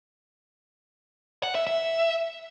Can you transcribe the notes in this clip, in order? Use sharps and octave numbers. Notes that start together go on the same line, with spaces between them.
F#5
E5
E5